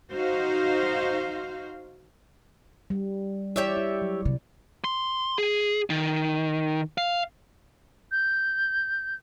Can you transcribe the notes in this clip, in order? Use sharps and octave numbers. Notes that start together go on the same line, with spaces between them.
D#4 F#4 C5 F5
G3
E4 G4 C#5 D5 E5
E4
F#3
C3
C6
G#4
D#3
F5
G6